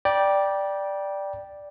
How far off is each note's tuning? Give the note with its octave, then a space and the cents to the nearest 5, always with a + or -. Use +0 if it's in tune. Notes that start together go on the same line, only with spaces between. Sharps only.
D5 +0 G5 +0 B5 -45